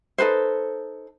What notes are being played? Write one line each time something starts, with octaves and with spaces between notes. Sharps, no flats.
D#4 A4 B4 C5